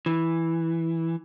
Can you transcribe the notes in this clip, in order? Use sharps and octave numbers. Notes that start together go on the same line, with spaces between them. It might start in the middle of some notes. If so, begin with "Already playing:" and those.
E3